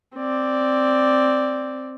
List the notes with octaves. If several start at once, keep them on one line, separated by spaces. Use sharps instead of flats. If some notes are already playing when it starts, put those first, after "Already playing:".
C4 D5